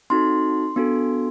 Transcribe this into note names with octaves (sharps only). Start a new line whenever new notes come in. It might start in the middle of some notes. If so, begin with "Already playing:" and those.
C4 D#4 F#4 A4 C6
B3 D4 F#4 A4